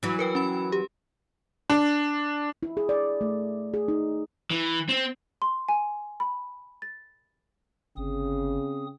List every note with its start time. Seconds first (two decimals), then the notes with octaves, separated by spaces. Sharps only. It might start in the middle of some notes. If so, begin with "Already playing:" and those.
0.03 E3 F#3
0.19 A#4 B4 G5
0.35 C#4 B5
0.72 G4
1.70 D4
2.63 E4
2.77 G#4
2.89 D5
3.21 A3
3.74 G#4
3.88 D#4
4.51 E3
4.89 C4
5.42 C6
5.69 G#5
6.20 B5
6.82 A6
7.97 G1 C#3 C4 G#4 D#6